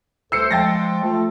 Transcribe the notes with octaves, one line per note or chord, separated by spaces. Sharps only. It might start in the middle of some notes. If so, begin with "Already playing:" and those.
D2 A4 C5 E6 C7 C#7
F3 G#3 G5 A6 A#6
A3 F4 A4